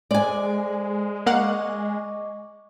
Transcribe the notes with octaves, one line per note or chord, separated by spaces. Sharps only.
G#3 A4 C5 D5 G#5
A#3 D#5 F5 F#5 C#6 D6